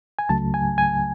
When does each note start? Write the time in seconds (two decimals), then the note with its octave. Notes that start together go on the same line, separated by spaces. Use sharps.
0.19 G#5
0.29 C#2 C#3 F#3 A3 A5
0.54 G#5
0.78 G#5